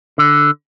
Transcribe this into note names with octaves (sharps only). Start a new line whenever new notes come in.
D3